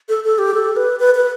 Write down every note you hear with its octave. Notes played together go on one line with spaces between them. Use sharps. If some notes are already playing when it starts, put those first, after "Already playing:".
A4
A4
G4
A4
B4
B4
B4